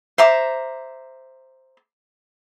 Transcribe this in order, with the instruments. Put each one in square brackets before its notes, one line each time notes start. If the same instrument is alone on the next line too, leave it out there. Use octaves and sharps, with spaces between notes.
[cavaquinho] C5 E5 A#5 D6